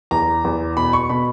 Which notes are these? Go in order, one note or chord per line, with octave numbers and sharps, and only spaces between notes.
E2 A#5
E2
B2 B5
C#6
B2 B5